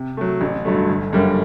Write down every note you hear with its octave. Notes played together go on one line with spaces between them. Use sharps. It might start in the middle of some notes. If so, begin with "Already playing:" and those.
Already playing: C3
F#3 A3
A1
G2 D3 F#3 A3
G1
F#2 D3 G3 A#3